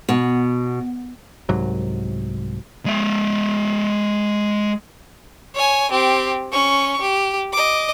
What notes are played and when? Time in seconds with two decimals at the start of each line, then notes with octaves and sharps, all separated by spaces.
0.09 B2
1.49 C2 G#2 F#3
2.86 G#3 E5
5.55 C#5 G#5
5.91 C4 G4
6.52 C#4 C#6
7.01 G4
7.52 D#5 D6